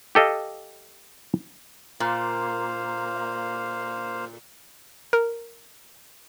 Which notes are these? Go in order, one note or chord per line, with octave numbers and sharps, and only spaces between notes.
G4 A4 D#5 F5
A#2 A#3 C5 F5
A#4